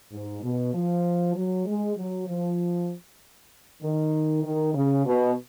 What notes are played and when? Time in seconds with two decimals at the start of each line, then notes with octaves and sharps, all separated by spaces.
0.12 G#2
0.43 B2
0.73 F3
1.35 F#3
1.66 G#3
1.97 F#3
2.27 F3
3.82 D#3
4.44 D#3
4.74 C#3
5.06 B2